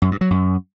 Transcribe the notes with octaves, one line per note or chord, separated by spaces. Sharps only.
F#2
G2
F#3
F#2